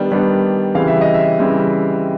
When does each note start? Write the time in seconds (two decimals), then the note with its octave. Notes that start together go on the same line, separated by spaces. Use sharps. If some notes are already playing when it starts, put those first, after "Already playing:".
Already playing: D#3 G3 B3 D4
0.11 D#3 G3 B3 D4
0.75 C#3 E3 G3 C4 F5
0.88 E5
1.01 D#5
1.14 E5
1.39 C#3 E3 G3 C4